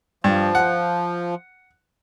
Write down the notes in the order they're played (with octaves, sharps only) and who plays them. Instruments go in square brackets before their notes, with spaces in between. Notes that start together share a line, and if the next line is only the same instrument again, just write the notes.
[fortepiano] G2 [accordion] F3
[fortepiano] F#5